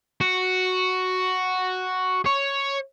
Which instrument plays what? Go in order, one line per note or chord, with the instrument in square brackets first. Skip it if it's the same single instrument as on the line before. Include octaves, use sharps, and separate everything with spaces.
[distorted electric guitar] F#4
C#5